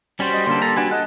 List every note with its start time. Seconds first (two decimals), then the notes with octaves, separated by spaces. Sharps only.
0.20 G3 C#4 F#4 C5
0.32 D#5
0.47 D3 A#3 A4 C5
0.62 A4 A#5
0.77 D4 F#4 B4 G#5
0.91 A4 D#5 F#5